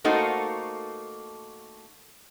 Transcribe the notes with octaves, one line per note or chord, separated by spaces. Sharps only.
A3 A#3 D#4 F#4 A4 C5